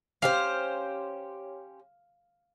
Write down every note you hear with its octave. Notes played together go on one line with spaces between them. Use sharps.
C#4 G4 C5 F5